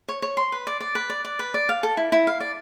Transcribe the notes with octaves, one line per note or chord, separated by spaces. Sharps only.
C#5
C#5
C6
B4
D5
D5
B4
D5
D5
B4
D5
F5
A4
E4
E4
F5
D5